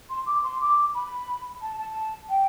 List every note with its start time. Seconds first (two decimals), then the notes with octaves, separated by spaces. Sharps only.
0.10 C6
0.26 D6
0.44 C6
0.61 D6
0.94 B5
1.62 A5
1.78 A5
2.29 G5